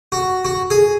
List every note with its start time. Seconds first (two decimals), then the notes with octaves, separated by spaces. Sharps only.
0.12 F#4
0.45 F#4
0.70 G#4